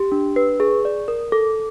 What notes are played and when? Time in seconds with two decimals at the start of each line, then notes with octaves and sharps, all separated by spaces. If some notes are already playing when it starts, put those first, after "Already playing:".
Already playing: G4
0.12 D4
0.36 B4
0.60 G#4
0.85 D5
1.08 A#4
1.32 A4